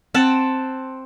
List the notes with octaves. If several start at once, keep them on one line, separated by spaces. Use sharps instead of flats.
C4 F#5 A5